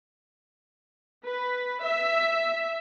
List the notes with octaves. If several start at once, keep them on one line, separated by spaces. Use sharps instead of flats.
B4
E5